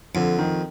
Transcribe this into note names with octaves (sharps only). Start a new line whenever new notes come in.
F2 D3
D#3